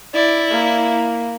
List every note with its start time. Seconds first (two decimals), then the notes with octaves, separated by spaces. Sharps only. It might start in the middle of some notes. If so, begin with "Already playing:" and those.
0.15 E4 D5
0.51 A#3